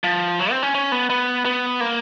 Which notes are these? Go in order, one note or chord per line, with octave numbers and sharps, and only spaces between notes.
F3
F#3
C4
C#4
C#4
B3
B3
B3
A#3